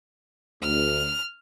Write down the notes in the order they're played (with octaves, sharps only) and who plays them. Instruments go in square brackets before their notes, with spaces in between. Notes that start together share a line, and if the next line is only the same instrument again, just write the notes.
[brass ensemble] D2 [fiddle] F6